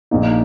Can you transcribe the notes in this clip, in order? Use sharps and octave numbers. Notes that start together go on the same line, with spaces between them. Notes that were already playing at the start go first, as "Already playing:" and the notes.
A#1 A#2 A#3 D#4